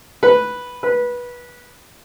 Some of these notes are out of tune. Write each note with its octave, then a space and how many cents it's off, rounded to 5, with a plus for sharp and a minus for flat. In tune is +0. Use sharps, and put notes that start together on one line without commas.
B4 -5
B4 -20